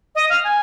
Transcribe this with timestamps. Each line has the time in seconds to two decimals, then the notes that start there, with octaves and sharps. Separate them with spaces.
0.15 D#5
0.30 F5
0.44 G#5